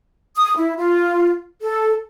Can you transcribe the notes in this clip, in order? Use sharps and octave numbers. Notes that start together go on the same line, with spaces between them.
D#6
E4
F4
A4